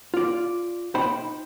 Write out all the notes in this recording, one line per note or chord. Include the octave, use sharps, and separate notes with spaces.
F4 D5
D#4 C5 G5 B5